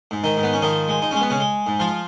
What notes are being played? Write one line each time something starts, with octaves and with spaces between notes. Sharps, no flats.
G#2
D#3 D#4
G#2
B3
C#4
D#3 F3 D#4
G#3
D#4
G#3 C#4
B3
C#3 C#4
G#3
G#2
F3 F4